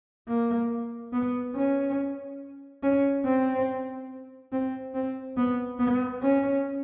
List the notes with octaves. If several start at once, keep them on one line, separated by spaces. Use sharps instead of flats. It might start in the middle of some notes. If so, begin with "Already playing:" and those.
A#3
B3
C#4
C#4
C4
C4
C4
B3
B3
C#4